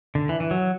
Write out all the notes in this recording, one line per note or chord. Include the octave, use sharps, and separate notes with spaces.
D3
E3
E3
F#3